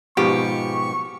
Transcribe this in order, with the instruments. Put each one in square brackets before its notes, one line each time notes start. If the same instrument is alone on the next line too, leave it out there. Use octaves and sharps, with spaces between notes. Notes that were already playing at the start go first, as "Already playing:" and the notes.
[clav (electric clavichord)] G#2 B2 F3 [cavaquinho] G4 [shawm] C#6